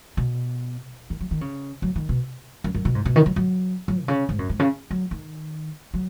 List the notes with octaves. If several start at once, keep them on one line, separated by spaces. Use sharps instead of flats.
B2
D#3
F#3
D#3
C#3
F#3
D#3
B2
F#2
F#2
B2
G#2
B2
D#3
F#3
F#3
F#3
B2
C#3
G#2
F#2
G#2
C#3
F#3
D#3
F#3